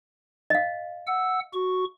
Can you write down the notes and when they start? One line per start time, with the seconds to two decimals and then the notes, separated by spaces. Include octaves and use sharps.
0.50 D#5 F5
1.07 F#5 E6
1.54 F#4 C#6